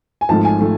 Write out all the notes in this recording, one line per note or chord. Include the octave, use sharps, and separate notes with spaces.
G#5
G#1 G#2 F3 A3 A5
G#5
F3 A3